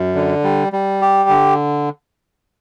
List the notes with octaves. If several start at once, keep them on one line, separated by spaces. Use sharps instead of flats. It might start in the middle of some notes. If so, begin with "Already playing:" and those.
Already playing: F#2
D3
G3
G3
G4
D3